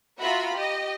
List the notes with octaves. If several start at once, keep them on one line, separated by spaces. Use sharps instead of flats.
F4 F#4 E5 A#5 B5
G4 D#5